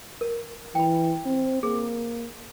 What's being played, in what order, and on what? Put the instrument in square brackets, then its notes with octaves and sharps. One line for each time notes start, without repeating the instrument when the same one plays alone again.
[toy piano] A#4
[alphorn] E3 [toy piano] G5 B5
[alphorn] C4
[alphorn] A#3 [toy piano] G#4